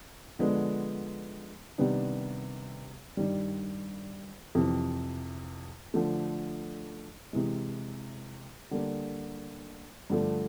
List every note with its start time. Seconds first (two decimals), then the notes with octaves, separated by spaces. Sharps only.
0.39 D3 F3 G#3 B3 D4
1.78 C3 D#3 G3 B3 D4
3.17 G2 D#3 G3
4.55 F2 C3 E3
5.94 D3 F3 A3
7.33 C3 E3 G#3
8.71 D3 G3 A#3
10.10 G2 D3 F3 A3